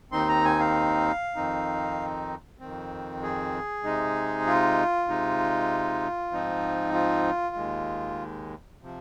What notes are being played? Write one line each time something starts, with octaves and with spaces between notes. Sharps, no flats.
D#2 D#3 C4 D#4 C6
A#5
G#5
F5
F2 D#3 C4 D#4
F2 D#3 C4
G#4
C3 G#3 D#4
F4
C3 G#3 D#4
G#2 F3 C4 D#4
F4
D#2 D#3 G#3
C3 F3